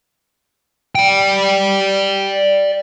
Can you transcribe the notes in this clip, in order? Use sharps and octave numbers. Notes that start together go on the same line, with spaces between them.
D5 G5